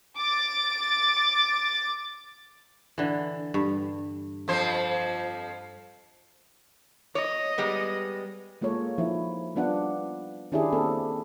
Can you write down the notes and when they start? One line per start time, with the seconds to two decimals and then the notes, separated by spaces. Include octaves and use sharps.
0.15 D6 A6
2.98 D3 E3
3.54 G2
4.48 F2 F3 C5
7.15 C#5 D#5
7.58 G3 G#3 B3
8.61 G#3 A#3 F4 A4 C#5
8.98 F3 D#4 E4
9.56 G3 B3 D4 F4 F#5
10.52 D#3 C#4 D4 E4 G4 G#4
10.72 A#3 C4 A4